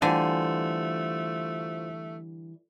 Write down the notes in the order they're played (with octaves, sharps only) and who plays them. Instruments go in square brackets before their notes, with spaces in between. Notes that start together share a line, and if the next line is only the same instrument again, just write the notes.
[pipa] D3 [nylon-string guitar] E3 G3 G#5 [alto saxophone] A3 [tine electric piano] F4 C5